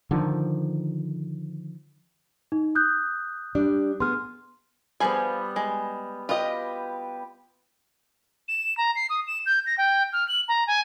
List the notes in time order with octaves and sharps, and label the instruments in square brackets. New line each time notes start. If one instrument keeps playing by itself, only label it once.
[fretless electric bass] D3 D#3 F3
[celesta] D#4
D#6 F#6 G6
[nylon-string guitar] G3 D4
[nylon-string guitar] B3 G#4 [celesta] C6 F6
[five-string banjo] F3 G#4 G#5 [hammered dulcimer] G3 B3
[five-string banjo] G#3
[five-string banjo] F4 D#5 [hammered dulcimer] G4 B4 G5
[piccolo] E7
A#5
C7
D#6
E7
G6
A#6
G5
F6
F#7
A#5
G#5